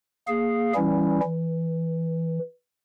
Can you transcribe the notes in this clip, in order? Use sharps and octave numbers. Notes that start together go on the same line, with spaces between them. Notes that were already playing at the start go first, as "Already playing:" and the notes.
A#3 G#4 F5
E3 G3 C#4 E4
E3